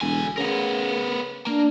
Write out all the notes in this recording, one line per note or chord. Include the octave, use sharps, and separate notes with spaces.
E1 D3 G#5
C#3 B3 A#4
A#3 D4